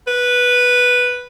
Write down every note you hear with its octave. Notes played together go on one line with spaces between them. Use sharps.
B4